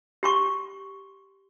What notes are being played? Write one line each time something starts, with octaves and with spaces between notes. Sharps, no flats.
G4 C6 C#6